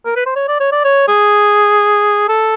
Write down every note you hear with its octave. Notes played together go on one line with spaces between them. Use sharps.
A#4
B4
C5
C#5
D5
C#5
D5
C#5
G#4
A4